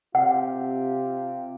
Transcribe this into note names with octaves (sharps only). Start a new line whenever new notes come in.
C3 F4 G4 F#5